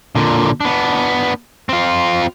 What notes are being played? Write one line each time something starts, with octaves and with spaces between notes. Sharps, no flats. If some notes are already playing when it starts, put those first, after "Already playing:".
A#2 D3
B3 D4
C4 F4